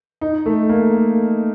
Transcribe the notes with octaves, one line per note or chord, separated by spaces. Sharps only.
D#4
A3
A#3